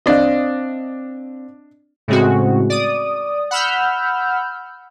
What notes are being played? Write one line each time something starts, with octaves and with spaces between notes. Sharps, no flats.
C4 D4 D5 D#5 F5
A2 C#3 G#3 C4 F#4
D5 D#6
F#5 B5 E6 F6 G6